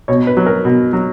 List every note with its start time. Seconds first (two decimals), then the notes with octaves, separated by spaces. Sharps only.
0.08 B2 C#5
0.27 B4
0.37 F#3
0.46 A#4
0.65 B2
0.93 F#3